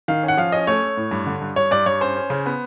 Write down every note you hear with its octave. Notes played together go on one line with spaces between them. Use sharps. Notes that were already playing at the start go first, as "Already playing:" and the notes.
D#3 F5
C#4
F#5
F3 F5
C#4 D#5
A3 C#5
A3
A2
G2
D3
G2
G2 C#5
G2 D5
G2 C#5
C#4 C5
C#4
C#3
B3